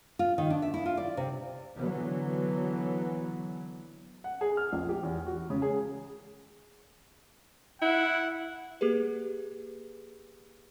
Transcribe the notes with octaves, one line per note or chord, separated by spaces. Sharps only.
F4
D#3
D4
E5
E4
F4
D5
C3
D3 E3 F#3 B3
F#5
G#4
F6
A#1
G4
E2
F#4
C#3
G#4
E4 F#5
A#3 G4 G#4 B4